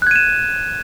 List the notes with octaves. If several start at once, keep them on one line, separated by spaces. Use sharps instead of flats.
F#6 G#6 D#7 E7